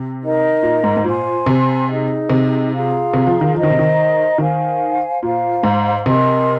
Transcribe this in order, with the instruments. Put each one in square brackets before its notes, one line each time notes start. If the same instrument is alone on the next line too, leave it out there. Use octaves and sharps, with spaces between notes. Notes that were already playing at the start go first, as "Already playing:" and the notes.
Already playing: [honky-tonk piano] C3
[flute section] D#4 A#4 D#5 A#5
[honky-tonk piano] A#2
G#2
G#2
[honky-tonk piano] A#2 [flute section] C5 G#5 C6
[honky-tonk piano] C3
[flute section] D#4 G#4 D#5
[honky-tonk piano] C3
[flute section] F4 G#4 F5 A#5
[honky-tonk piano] C3
F3
D#3
[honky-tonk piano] F3 [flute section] C5 D#5 A#5
[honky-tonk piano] D#3
C3
D#3
[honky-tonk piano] D#3 [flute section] C5 F5 G#5
[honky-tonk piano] A#2 [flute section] C5 F5 A#5
[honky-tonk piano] G#2
[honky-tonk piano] C3 [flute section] A#4 D#5 G#5 C6